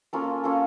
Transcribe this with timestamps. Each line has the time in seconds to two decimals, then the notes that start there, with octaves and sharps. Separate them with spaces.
0.13 A#3 C#4 F4 A4
0.44 A#3 C#4 F4 A4